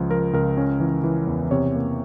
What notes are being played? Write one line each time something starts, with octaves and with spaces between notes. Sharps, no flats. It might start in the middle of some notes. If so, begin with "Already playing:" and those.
Already playing: C#2 F3
F3 A#4
C#2 A#4
C#4
E3
E3
E2
C3 C#5
A#3